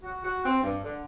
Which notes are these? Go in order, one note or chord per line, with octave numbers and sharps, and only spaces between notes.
F#4
F#4
C4
G2
D3